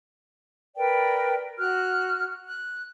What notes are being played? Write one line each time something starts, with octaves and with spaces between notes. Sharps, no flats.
A#4 B4 D5 G5
F#4 F6 F#6
F#6